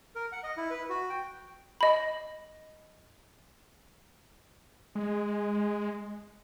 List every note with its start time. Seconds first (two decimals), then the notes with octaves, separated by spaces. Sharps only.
0.15 A#4
0.32 F#5
0.43 D#5
0.57 E4
0.70 B4
0.89 F#4
1.10 G5
1.81 D#5 B5
4.95 G#3